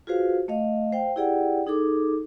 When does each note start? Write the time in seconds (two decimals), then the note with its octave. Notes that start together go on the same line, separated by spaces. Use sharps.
0.07 F4 F#4 G#4 B4 C5 F5
0.48 A3 D#5 F5
0.92 C5 F5 G5
1.16 E4 G4 G#4 D5 F#5 G5
1.67 D#4 G#4 A4 D6